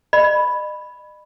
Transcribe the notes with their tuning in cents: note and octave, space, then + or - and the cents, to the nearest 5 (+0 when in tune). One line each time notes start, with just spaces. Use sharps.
D#5 -45 B5 +0